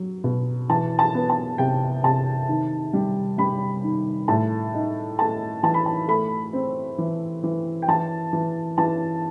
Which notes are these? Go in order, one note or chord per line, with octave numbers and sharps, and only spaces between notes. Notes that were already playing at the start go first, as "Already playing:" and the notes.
Already playing: F#3
B2
E3 A5
A5
B3
A5
C3 G5
C3 A5
D#3
G3
G3 B5
D#3
A2 A5
D#4
A3 A5
E3 A5
B5
A5
A3 B5
C4
E3
E3
G5
E3 A5
E3
E3 A5